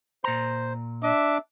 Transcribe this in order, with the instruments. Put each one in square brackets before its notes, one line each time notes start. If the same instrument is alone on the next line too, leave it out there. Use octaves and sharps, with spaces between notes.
[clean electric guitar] A#2 A#5 [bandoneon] C5
[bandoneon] D4 D6 [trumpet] E5